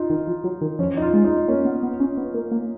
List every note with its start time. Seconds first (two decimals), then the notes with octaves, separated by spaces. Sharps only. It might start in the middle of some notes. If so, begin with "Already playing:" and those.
Already playing: D#4 F4
0.10 D#3
0.27 F3
0.44 F#3
0.61 D#3
0.79 F3 C#4
0.97 D#4
1.02 F4
1.13 G#3
1.24 D#4
1.48 A#3 C#4
1.65 B3
1.83 B3
2.00 C#4
2.17 B3
2.34 A#3
2.52 A#3